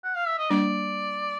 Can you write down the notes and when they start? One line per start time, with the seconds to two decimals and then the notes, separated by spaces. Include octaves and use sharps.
0.04 F#5
0.16 F5
0.27 E5
0.38 D#5
0.50 G3 A#3 D4 D5